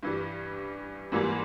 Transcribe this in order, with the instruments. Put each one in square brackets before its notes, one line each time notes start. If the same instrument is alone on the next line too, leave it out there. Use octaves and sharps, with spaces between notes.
[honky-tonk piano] G2 E3 G3
G#2 E3 G3 A#3